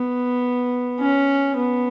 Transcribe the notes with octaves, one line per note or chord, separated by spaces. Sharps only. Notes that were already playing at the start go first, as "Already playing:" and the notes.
Already playing: B3
C#4
B3